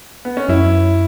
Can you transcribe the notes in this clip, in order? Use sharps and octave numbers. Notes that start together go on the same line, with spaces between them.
B3
C#4
F#2 E4